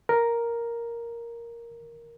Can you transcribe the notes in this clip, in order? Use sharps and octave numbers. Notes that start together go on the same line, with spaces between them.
A#4